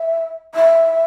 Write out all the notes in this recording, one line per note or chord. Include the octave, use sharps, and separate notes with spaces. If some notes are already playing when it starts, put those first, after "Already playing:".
Already playing: E5
E5